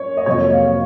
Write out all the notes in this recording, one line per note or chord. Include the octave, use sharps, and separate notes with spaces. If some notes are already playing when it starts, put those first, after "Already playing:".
Already playing: F#2 C#5
D#5
F2 C3 F#3 A#3 C#5
F5